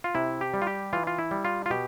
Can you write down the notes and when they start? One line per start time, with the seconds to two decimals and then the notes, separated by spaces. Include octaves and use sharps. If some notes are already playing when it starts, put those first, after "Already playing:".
0.04 F4
0.15 C3 E4
0.41 G4
0.54 G3
0.62 F4
0.67 G4
0.93 E3 F4
1.07 F4
1.18 E4
1.31 G3
1.45 F4
1.66 F4
1.70 B2 G4